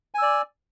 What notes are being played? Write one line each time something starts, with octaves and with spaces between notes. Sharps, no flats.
D5 G#5 E6